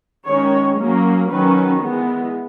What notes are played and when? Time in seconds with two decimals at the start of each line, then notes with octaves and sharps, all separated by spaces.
0.26 D#3 G#3 C#4 C#5
0.78 F#3 A#3 C#4
1.30 D#3 F#3 C#4 B4
1.81 E3 G#3 B3